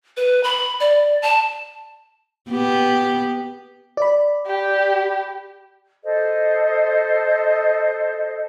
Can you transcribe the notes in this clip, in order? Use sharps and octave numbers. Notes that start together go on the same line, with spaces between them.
B4
B5
D5
A5
B3 G4
D5 B5
G4
A4 C5 D#5